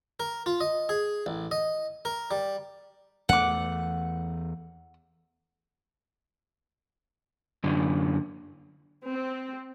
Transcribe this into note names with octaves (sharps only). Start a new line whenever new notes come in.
A#4
F4
D#5
G#4
A1
D#5
A#4
G3
E2 A3 F#5 D6
F#2 D3
C4